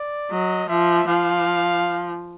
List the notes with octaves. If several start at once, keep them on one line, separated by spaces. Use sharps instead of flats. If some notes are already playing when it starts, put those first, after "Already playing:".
Already playing: D5
F#3 D#5
F3 E5
F3 F5